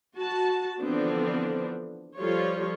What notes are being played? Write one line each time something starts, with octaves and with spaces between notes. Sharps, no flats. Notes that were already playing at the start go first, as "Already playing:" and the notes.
F#4 A5
D3 E3 F3 B3 C4 D4
F3 G3 F4 A4 C#5